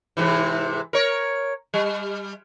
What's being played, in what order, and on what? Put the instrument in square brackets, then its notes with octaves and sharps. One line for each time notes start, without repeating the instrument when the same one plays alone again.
[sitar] G#2 C3 E3
A#4 C#5
G3